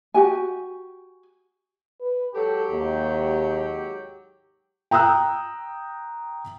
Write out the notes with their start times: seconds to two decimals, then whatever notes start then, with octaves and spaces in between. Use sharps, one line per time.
0.14 F#4 G4 G#5
2.01 B4
2.35 G#2 F#3 G4 A4
2.71 D#2
4.91 G5 A#5 D#6 E6 F#6